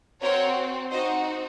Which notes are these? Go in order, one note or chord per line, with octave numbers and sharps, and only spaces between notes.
C4 F#4 A#4 C#5
C4 D#4 F#4 C5 D#5